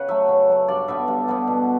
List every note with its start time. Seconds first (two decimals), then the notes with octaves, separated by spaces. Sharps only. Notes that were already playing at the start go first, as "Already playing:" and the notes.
Already playing: C#3 B4 F#5
0.09 F#3 A3 E5
0.29 C#3
0.49 F#3 A3
0.68 G2 D5
0.88 D3 G3 B3 E5
1.08 G2
1.28 D3 G3 B3
1.48 B2